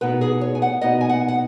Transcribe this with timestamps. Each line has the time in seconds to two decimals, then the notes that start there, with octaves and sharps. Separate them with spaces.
0.01 B2 B3 D#4 B4
0.21 G#4
0.41 C#5
0.55 G#5
0.62 F#5
0.81 B2 B3 D#4 D#5
1.01 G#5
1.09 F#5
1.28 F#5